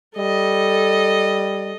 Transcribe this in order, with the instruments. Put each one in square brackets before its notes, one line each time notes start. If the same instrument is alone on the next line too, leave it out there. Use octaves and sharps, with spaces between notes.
[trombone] G3 [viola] A4 D#5